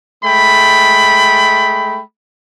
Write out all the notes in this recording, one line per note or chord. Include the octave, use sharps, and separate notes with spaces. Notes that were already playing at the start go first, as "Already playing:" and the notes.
G#3 A3 G5 B5